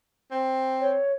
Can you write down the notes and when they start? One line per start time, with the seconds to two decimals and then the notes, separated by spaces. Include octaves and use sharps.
0.31 C4
0.81 C#5